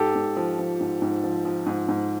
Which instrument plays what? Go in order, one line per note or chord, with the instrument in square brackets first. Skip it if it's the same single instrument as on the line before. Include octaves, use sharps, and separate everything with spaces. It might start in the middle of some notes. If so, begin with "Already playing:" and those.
Already playing: [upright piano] G#2 G4 A4
G#2
F3
F3
G#2
G#2
F3
F3
G#2
G#2